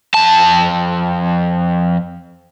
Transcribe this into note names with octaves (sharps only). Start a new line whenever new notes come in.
F2 A5